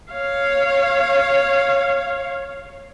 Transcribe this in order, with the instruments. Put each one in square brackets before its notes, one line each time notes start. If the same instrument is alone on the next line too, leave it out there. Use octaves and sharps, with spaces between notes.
[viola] C#5 F5